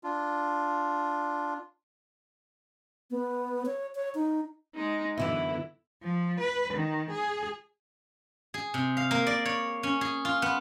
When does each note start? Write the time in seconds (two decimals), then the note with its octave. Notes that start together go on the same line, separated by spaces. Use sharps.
0.04 D4 F4
3.11 B3
3.66 C#5
3.95 C#5
4.15 D#4
4.75 G#3 D#4
5.18 F#2 D3 E3 B3 E4 E5
6.02 F3
6.40 B4
6.74 D#3
7.11 G#4
8.54 G#4
8.74 C3
8.97 F5
9.11 A#3
9.27 D5
9.46 C#5
9.83 C#4
10.01 G#4
10.25 F4
10.42 B3